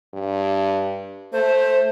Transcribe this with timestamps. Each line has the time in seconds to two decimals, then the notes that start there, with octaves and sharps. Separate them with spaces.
0.14 G2
1.33 A3 C5